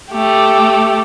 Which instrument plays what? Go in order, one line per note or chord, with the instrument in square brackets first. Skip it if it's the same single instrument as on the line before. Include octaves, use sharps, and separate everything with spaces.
[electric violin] A3 G4